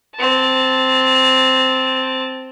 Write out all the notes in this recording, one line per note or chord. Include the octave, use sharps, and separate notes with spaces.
C4 A5